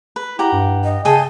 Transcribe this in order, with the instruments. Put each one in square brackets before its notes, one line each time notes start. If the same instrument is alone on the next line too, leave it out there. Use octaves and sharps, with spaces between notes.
[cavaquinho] B4
[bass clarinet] E4 [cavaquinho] G4 F#5 A#5
[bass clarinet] G2
[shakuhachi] D#5
[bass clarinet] C#3 [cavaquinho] G#4 D#5 G5 [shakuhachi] A5